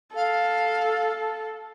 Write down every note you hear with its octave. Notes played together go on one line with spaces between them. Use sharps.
A4 F5